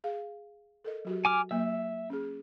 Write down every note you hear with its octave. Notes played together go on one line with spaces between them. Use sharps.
G#4 F5
A4 A#4 D#5
F#3 F#4 G4
G#5 D6 F6
F#3 A#3 E5
C#4 G#4